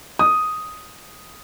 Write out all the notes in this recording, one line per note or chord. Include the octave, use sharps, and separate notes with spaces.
D#6